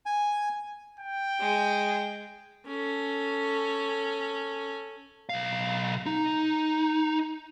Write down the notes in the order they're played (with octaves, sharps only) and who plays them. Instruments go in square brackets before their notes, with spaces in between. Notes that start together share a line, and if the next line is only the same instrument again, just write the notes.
[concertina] G#5
[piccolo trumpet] G5
[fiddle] G#3
[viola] C#4 A4
[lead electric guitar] B1 F5
D#4